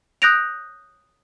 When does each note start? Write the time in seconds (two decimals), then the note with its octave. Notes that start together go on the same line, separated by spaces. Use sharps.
0.22 D#6 F#6 G6 A#6 D7 F7